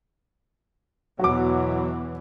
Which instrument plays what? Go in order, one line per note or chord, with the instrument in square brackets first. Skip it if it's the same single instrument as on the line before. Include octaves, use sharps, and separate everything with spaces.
[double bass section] E2 B2 E3 [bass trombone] F#3 [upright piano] F#4 D6